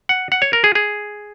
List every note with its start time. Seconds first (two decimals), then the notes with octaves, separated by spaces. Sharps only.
0.09 F#5
0.32 F#5
0.42 C#5
0.53 A#4
0.64 G#4
0.75 G#4